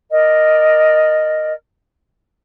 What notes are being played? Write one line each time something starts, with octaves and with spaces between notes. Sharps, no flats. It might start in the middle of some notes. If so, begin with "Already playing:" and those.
A#4 D5 D#5